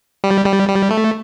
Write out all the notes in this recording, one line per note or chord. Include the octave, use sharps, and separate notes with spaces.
G3
G3
G3
A3